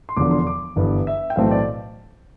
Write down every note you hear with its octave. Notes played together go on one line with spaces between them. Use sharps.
C6
E1 E2 D3 F3 D6
C6
D6
G1 G2 E3 B3
E5
G5
B1 A2 E3 A3 C4 F5
D5